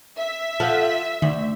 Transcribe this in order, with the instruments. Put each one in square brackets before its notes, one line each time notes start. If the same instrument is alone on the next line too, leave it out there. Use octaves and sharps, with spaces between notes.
[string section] E5
[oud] F3 [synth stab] A4 F5 F#5
[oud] D2 [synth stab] D#3